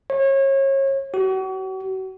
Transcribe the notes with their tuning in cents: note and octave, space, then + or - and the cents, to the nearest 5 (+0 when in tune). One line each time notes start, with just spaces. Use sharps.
C#5 -30
F#4 +40